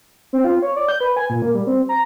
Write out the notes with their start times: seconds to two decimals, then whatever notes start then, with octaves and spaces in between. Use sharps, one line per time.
0.33 C4
0.44 F4
0.62 C#5
0.76 D5
0.89 G6
1.00 B4
1.17 G#5
1.30 A#2
1.42 A#3
1.54 G3
1.67 C4
1.89 A#5